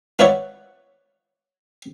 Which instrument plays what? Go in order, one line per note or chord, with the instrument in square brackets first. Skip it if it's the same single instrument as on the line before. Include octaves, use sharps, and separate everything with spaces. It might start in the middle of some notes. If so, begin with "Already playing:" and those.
[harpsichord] F4 B4 C#5 D5 E5 F#5